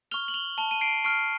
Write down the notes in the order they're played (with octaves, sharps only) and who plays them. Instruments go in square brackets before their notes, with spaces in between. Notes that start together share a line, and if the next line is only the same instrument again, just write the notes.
[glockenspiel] C#6 F6 F7 G7
F#7
F7 G7
A5 F7 G7
D#7
C7 D7
C#6 F6 C7 D7